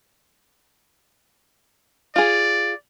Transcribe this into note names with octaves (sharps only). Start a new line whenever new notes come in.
F4 G#4 D5